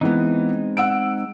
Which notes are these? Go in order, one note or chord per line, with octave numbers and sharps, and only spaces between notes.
E3 G#3 B3 C4 D#4
F#5 E6 D7